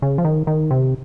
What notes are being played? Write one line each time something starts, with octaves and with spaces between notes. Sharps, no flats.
C#3
F3
D#3
D#3
C3